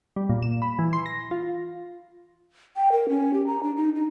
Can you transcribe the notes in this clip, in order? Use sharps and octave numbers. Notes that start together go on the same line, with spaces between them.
G3
A#2
E7
B5
E3
C6
A#6
F4
G5
A#4
C#4
G4
A#5
D4
D#4
D#4